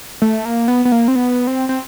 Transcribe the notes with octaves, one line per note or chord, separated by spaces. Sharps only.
A3
A#3
B3
B3
A#3
C4
B3
C4
C4